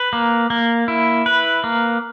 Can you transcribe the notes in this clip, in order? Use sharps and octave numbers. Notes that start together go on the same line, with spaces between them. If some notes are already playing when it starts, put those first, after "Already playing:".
Already playing: B4
A#3
A#3
E4
B4
A#3